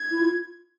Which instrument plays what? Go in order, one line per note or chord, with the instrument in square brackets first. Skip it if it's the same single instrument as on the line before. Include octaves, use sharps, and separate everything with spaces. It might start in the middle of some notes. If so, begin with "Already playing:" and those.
Already playing: [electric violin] G#6
[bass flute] E4
F4